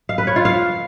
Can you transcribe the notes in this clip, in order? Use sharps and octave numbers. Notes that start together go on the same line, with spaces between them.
F5
B4
C#5
F4
F5